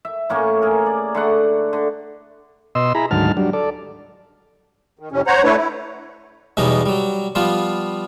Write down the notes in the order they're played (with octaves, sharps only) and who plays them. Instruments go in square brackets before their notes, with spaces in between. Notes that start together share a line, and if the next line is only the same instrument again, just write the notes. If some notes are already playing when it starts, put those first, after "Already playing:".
[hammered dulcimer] E5
A2 A#3 C#4 C#6
G#4 A#4
D5
D3 A3 F#5
D3
[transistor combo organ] B2 D#5 C6 E6
E4 G#4 A#5 B5
D2 G#2 D#3 F#3 A5 F6
F#3 G3 D4
A4 D5
[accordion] D#3
F2 A2 C3 C#4
C5 C#5 F#5 A#5
A3 D4 E4 B4 C#5
E4
[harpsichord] E2 B2 F#3 G3 B3 D#4
F#3 G3
F3 G3 B3 F4